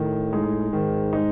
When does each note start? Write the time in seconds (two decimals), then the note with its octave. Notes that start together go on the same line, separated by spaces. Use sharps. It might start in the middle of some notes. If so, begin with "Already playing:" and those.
Already playing: A2 D#3
0.33 G#3 D#4
0.72 G#2 D#3
1.13 G#3 D#4